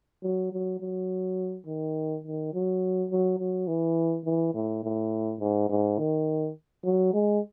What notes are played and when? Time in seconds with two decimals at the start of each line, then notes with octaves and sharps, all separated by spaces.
0.23 F#3
0.52 F#3
0.80 F#3
1.66 D#3
2.24 D#3
2.54 F#3
3.11 F#3
3.39 F#3
3.68 E3
4.25 E3
4.54 A2
4.83 A2
5.40 G#2
5.69 G#2
5.99 D#3
6.85 F#3
7.14 G#3